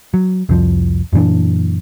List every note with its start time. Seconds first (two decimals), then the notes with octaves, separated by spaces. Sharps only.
0.14 F#3
0.49 C2 F2 F3
1.13 F#2 A#2 E3 D4